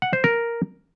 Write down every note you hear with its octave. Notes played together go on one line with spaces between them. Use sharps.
F#5
C5
A#4